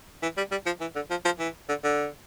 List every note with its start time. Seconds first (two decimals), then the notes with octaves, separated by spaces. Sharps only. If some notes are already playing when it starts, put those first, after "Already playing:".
0.23 E3
0.37 G3
0.51 G3
0.66 F3
0.81 E3
0.95 D3
1.11 F3
1.25 F3
1.39 E3
1.69 D3
1.84 D3